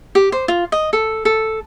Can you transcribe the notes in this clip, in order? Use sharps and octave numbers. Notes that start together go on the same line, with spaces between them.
G4
C5
F4
D#5
A4
A4